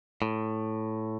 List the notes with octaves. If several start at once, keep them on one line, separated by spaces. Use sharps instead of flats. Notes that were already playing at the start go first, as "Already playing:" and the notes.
A2